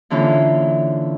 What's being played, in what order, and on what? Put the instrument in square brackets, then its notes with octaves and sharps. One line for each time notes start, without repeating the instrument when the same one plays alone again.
[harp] A#2 D3 E3 C#4 F4